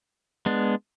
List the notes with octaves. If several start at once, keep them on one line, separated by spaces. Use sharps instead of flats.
G#3 B3 D4